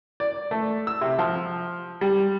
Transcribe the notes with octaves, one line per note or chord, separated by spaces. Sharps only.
D5
A3
E6
C3
F3
G3